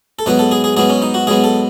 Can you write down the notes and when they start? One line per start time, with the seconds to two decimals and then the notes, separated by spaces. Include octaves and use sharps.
0.19 A4
0.26 G#2 F#3 B3 B4
0.39 A4
0.51 G#4
0.64 G#4
0.77 G#2 F#3 B3 G#4
0.90 C#4
1.02 D#4
1.14 F#4
1.27 G#2 F#3 B3 G#4
1.44 A4